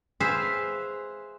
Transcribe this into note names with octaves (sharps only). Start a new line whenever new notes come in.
G#4 B4 C5 E5 F5